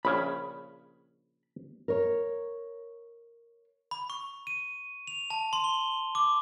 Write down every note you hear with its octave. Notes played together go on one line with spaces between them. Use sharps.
A#1 C#3 C#4 B5
A#4 C#5
B5
C#6
D#7
F7
A5
C6
G7
D6